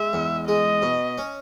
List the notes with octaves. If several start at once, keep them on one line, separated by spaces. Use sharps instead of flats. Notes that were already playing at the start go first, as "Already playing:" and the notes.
Already playing: G#3 E5
E2
G#3 D#5
B2
C#4